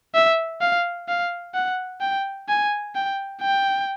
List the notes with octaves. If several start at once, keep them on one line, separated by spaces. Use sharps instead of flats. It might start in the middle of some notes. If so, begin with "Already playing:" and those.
E5
F5
F5
F#5
G5
G#5
G5
G5